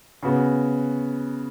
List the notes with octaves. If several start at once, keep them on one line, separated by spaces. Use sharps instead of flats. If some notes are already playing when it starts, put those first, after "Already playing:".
C#3 B3 F#4